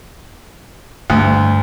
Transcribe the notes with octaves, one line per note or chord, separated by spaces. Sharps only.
D2 G2 D3